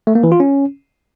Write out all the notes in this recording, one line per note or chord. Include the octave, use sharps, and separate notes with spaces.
A3
A#3
E3
F4
C#4